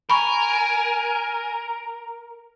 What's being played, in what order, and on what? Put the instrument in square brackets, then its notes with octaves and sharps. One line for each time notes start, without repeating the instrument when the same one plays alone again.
[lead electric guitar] A#4 [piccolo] G#5 [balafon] B5 C#6